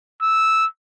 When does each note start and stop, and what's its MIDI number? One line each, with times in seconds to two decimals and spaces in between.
0.22 0.66 88